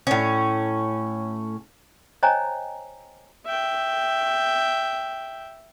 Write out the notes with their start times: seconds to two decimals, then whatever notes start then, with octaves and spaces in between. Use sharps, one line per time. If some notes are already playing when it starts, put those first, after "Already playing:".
0.07 A2 C#4
2.23 C5 C#5 D#5 G5 G#5 A#5
3.46 E5 G5